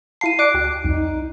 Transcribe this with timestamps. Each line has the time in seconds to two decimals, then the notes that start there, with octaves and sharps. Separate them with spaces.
0.21 E4 F5 A5 C7 D#7
0.39 D5 D6 F#6 D7
0.54 D2 F#4 G5
0.84 C2 F2 D#4